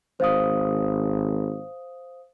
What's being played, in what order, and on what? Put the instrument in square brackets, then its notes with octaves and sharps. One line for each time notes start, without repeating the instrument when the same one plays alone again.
[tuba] G#1 [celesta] C5 F5 D#6